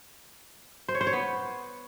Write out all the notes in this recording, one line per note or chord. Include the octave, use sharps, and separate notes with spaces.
C5
C#5
C5
C#5
B3